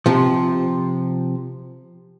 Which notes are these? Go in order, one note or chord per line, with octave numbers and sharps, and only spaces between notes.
C3 F3